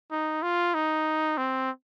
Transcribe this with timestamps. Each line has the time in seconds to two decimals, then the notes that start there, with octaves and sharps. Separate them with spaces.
0.11 D#4
0.43 F4
0.74 D#4
1.37 C4